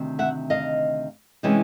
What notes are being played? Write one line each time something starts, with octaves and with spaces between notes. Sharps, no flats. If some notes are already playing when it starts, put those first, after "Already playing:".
Already playing: D2 C3 D#3
E5 F#5
D#5 F5
C3 E3 G#3 C#4